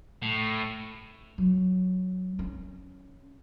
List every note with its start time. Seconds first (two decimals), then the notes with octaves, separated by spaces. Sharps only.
0.22 A2
1.38 F#3
2.39 C#4